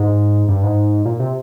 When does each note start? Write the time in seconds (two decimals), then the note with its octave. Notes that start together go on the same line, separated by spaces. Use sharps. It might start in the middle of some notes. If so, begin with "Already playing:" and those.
Already playing: G#2
0.49 G2
0.63 G#2
1.05 A#2
1.20 C3